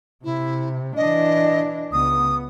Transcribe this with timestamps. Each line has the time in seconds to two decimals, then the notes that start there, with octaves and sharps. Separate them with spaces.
0.24 C3 E4
0.96 E3 D4 D#5
1.93 C#2 B3 D#6